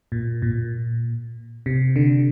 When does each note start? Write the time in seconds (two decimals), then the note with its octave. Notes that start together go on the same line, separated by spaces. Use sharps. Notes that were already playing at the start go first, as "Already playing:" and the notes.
0.12 A#2
0.42 A#2
1.66 C3
1.96 D3